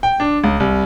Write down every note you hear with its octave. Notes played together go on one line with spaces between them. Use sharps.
G5
D4
C#2
C2